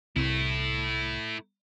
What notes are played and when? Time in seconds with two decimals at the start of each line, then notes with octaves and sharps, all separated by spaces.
0.16 C2 A3 E4